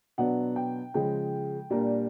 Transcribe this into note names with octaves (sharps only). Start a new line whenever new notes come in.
B2 F#3 B3 D4 F#5
G5
C#3 F3 G#3 G5
A#2 G3 A#3 D4